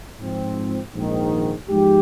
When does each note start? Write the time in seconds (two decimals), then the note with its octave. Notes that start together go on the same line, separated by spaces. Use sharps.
0.19 G#2 F3 C4
0.94 A#1 G#2 D#3
1.69 G#2 F3 G#3 D#4 G4